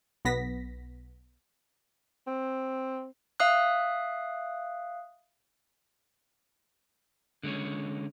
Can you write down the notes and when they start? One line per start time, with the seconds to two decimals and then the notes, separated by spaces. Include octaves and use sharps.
0.25 B1 B3 A#6 B6
2.27 C4
3.40 E5 F5 D#6 F#6
7.43 D3 G#3 A#3 C#4